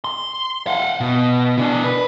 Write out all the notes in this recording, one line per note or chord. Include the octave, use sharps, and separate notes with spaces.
C6
F5 F#5
B2
B2 D4
B4